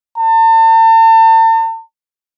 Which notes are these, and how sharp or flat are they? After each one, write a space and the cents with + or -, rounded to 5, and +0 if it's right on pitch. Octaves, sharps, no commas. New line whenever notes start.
A5 +40